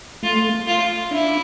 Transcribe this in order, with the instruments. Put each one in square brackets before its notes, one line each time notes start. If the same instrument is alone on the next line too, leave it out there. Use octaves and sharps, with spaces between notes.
[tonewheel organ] A3 [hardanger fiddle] F4
[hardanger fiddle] F4
[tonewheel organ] D4 [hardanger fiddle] E4